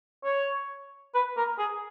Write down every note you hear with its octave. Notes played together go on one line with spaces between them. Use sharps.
C#5
B4
A#4
G#4